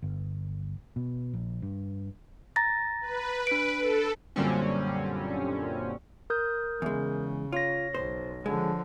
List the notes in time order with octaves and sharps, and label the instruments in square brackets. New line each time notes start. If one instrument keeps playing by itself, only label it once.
[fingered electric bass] G1
B2
A#1
G2
[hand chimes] A#5 A6 A#6
[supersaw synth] B4
[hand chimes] D4 D7
[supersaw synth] A4
[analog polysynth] F#2 A#2 D3 G3 C4 C#4
[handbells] A#4 D#6 G6
[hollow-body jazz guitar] E2 G#3 [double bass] C#3
[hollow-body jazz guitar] F4 [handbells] C#5 A#6
[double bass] B1 [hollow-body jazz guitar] C5
[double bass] D3 F3 [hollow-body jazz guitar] G#3